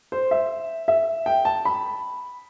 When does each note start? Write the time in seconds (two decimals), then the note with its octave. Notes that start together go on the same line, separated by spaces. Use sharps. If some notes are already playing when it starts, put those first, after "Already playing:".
0.12 C5
0.31 E5
0.88 E5
1.26 G5
1.45 A5
1.65 B5